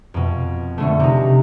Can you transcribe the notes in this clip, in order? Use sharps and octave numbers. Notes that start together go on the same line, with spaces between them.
F2 B2
B2 D3 A3
C3 D#4